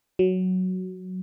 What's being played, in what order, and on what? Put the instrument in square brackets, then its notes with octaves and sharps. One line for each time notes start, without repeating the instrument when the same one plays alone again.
[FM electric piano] F#3